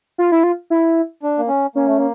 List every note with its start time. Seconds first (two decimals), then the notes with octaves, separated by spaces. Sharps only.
0.18 F4
0.32 E4
0.43 F4
0.70 E4
1.23 D4
1.38 A#3
1.48 C#4
1.75 A#3 C#4
1.86 A3
1.97 A#3